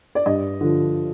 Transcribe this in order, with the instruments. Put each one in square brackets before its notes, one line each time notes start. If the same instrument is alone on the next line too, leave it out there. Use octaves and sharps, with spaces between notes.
[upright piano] D5
G2 D#5
D3 F3